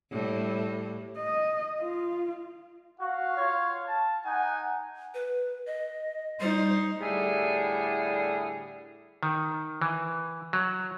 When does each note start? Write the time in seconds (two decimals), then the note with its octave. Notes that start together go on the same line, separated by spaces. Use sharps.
0.11 A2 G3
1.18 D#5
1.80 F4
3.00 F#4 F5
3.36 F4 C#5
3.86 A5
4.25 D#4 F#5 G#5
5.14 B4
5.66 D#5
6.40 G3 D#4 C5
7.01 A2 D3 G3 E4 G#4
9.23 D#3
9.82 E3
10.53 F#3